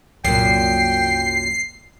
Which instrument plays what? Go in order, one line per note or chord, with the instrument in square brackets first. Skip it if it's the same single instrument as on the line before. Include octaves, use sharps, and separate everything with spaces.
[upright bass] C2 F#3 [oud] F#2 A#2 [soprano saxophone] G5 [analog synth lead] C7